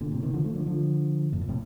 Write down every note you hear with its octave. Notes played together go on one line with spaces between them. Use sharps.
A#2 D3
A2 C3
C3 D#3
D3 F3
F3 A3
D3 F3
D3 F3
F2 A2
A#2
A2 C3